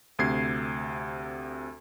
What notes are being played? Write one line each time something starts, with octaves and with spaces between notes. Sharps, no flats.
D2 C3 G#6 C7